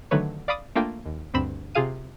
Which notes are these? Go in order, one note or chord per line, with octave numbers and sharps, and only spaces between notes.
D3 D#3 F#3 A3 B4 C#5
D5 F5 B5 D6 D#6
A3 A#3 D4 F4 G5
D#2
D2 G2 C4 B5 E7
C3 F4 G#4 F5 D#7